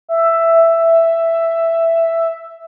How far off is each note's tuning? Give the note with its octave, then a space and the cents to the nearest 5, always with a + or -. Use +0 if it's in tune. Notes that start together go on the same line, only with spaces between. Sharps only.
E5 +5